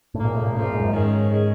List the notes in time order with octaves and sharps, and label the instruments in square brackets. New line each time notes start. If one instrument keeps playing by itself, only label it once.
[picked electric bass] A2 [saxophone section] C#3 F3 A#3
[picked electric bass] A#2
A2
A#2
[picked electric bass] A2 [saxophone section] C#3 F3 A#3
[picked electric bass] A#2
G#2
F#2
[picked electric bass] G#2 [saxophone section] D#3 G#3 C#4
[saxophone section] D#3 G#3 C#4